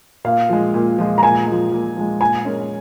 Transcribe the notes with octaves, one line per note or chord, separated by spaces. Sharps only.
A#2 F5
F3 G#3
A#2
F3 G#3
A#5
A#2 G#5
F3 G#3
A#2
F3 G#3
A#2 G#5
G#3 C#4 A#4